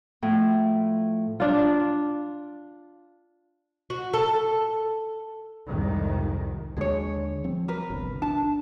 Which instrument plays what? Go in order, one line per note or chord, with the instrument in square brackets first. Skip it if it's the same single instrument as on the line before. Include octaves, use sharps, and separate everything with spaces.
[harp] A2 F3
[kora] D4 F4
[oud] F#4
A4
[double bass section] C2 F2 G#2 D#3
[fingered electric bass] D#2 D3 G#3 [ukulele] G#4 C#5
[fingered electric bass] F3 C4
[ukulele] A#4 B4
[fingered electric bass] G1 C2
[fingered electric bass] D4 [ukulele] A5